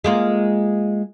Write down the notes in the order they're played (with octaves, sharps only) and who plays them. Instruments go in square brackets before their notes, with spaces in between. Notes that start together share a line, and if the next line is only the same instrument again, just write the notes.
[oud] G#3 A#3 F4